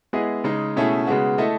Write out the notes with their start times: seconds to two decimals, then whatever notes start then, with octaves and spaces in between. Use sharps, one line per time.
0.13 G#3 B3 E4 G#4 D#5
0.44 C#3 G#3 D#4
0.76 B2 A3 C#4 E4 G#4
1.07 C#3 G#3 B3 F#4
1.38 A3 E4 A4 D#5